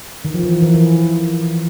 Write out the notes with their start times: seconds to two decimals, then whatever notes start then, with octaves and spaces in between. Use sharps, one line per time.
0.25 D#3
0.34 F3
0.44 E3
0.62 E3
0.75 E3